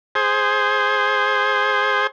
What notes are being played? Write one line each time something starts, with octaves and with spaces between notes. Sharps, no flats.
G#4 C5